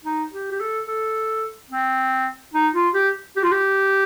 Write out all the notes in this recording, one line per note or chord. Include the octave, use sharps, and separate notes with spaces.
D#4
G4
G4
A4
A4
C4
D#4
F4
G4
G4
F4
G4